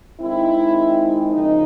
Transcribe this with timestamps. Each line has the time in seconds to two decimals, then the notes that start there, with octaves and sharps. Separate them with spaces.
0.20 D#3 G#3 C4 D#4 E4
1.33 C#3 F3 A#3 D#4